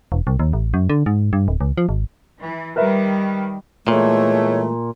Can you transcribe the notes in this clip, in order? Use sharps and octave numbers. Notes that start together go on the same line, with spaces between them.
E1
C2
D#2
A1
F#2
D3
G#2
G2
D1
C#2
F3
G#1
E3
D#3 G3 A#4 B4 E5
A#2 E3 G#3 A3 C#5